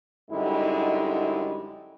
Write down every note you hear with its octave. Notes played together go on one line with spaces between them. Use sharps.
F#2 D3 G3 G#3 D#4 E4